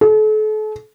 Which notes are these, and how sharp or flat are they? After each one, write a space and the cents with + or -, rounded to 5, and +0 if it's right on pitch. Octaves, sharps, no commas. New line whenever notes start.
A4 -40